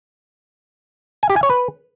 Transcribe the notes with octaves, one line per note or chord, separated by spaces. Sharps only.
G#5
G4
G#5
C#5
B4